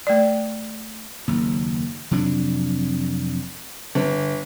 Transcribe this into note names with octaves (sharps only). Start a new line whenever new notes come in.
A3 D5
F#1 D#2
F2 C3 F#3 D4
G1